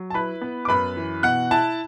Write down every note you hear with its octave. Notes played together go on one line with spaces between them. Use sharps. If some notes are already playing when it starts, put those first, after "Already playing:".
Already playing: F#3
A5
E4 B4 B5
B3
D6
F#2 B4 B5
E3
B2 F#5 F#6
E4 A5